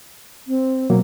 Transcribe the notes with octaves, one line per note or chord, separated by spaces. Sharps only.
C4
B2 F#3 A#3